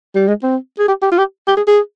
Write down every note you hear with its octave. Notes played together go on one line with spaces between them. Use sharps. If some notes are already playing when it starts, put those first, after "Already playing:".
G3
G#3
C4
G#4
G4
G4
F4
G4
G4
G#4
G#4